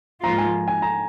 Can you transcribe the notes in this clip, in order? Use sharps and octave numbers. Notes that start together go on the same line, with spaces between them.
G#2 F3 A#3 F4 A#5
G#5
G#5
A#5